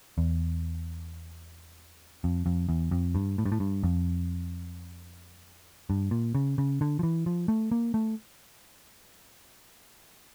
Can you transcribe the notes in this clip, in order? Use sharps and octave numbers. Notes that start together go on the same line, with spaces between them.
E2
F2
F2
E2
F2
G2
A2
G2
A2
G2
F2
G2
A#2
C#3
C#3
D3
F3
E3
F3
A3
A#3
A3